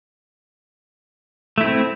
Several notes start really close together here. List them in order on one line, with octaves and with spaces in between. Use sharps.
A3 E4 C4